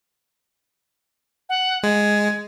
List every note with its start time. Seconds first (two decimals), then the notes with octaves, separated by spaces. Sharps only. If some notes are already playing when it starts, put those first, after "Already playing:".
1.49 F#5
1.83 G#3 G#6